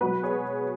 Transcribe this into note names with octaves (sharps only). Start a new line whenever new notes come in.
B2 F#3 F#4 B4
G#4 C#5